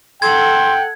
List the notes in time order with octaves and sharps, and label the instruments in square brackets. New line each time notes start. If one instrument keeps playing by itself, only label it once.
[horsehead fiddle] A4 F#5 [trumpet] G5 [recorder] C6 [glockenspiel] G#6